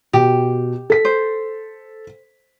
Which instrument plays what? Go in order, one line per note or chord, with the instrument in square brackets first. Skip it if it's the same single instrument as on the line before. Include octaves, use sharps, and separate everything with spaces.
[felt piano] B2 [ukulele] G4
[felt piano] A4 B6
[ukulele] C5